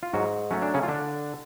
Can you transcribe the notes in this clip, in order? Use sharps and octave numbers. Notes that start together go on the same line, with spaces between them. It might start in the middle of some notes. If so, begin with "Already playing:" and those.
F4
G#2 F#3 F#4
F#3 A3 C#4
D4
C#3 C#4
F4
D3 D4